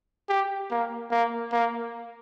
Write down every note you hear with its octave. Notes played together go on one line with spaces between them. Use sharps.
G4
A#3
A#3
A#3